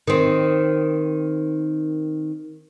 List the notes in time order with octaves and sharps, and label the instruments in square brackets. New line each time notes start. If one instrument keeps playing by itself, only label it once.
[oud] D#3 C4